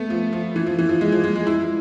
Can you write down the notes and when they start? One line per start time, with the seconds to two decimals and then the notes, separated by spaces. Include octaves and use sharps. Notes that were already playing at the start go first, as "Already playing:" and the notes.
Already playing: A3 B3
0.10 F3
0.33 F3
0.56 E3
0.66 F3
0.78 E3
0.89 F3
1.01 G#3
1.12 F3
1.24 G#3
1.35 G#3
1.47 E4